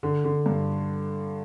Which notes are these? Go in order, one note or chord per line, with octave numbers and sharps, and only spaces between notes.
D3
D3
G2